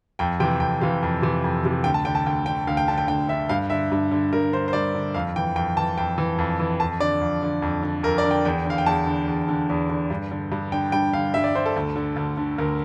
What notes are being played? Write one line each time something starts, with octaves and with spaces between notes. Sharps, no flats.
F2 G5
C3 E3 G5
F2 G5
C3 E3 F5
F2
C3 E3
F2
C3 E3
D2 G5
A5
D3 G5
A5
D2 G5
D3 G5
D2 F5
G5
D3 A5
G5
D2 G5
D3 E5
G2 F5
D3 E5
G2
D3
G2 A#4
D3 C5
C5
G2 D5
D3
F2 F5
E3 G5
F2 G5
E3 A5
F2 G5
E3
F2
E3
F2 A5
D3 D5
F2
D3
F2
D3
F2 A#4
D5
D3
G5
E2 G5
D3 F5
G5
E2 A5
D3
E2
D3
E2
D3
G2
D3
G2
D3 G5
G2 G5
D3 F5
G2 E5
D5
D3 C5
A4
D2
D3
D2
D3
D2 A#4